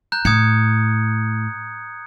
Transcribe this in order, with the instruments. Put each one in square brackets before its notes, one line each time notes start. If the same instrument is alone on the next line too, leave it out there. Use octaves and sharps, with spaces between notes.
[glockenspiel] A#5 F#6 G6
[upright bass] A2 [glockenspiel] D#6 G#6 C#7